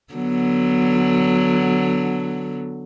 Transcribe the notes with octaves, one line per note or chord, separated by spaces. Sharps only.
D3 F#3 B3